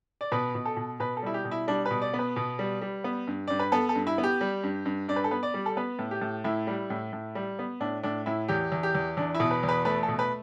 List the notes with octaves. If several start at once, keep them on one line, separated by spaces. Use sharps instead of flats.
D5
B2 B4
B2
A4
B2
B2 B4
A4
G3 E4
G4
B2
E4
G3 D4
B4
B2
D5
B3
B4
B2
G3
G3
B3
G2
G2 D5
B4
B3 A4
A4
G2
E4
B3
G4
G3
G2
G2
G2 D5
B4
A4
B3 B4
D5
G3
A4
B3 B4
A2
G4
A2
A2 E4
G3
A2
A2
G3
B3
A2 D4
A2 D4
A2 E4
E2 G4
E2
G4
E2
E2 D4
E4
B2
B4
E2
B4
A3 B4
A4
B2
B4